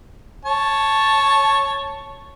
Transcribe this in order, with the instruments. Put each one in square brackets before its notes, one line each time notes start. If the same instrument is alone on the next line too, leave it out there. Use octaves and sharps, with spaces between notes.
[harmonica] C#5 A5